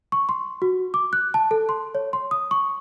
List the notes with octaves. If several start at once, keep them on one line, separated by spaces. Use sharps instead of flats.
C#6
C6
F#4
D6
F#6
A5
A4
C6
C#5
C6
D#6
C#6